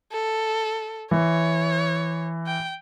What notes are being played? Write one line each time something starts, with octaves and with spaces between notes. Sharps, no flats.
A4
E3 C#5
G5